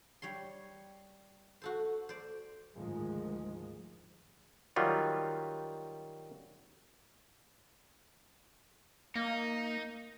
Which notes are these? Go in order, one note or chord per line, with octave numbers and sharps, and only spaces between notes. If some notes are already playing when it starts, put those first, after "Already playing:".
G3 C#5 C6
F#4 A4 C5
C5 D5
D2 G#2 D#3 F3 G#3
D#3 F#3 G3 F4
A#3 D#4